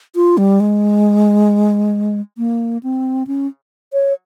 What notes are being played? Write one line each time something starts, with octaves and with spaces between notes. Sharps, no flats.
F4
G3
G#3
A#3
C4
C#4
C#5